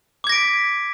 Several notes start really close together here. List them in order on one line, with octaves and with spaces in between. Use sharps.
D6 G#6 A#6 D7 B6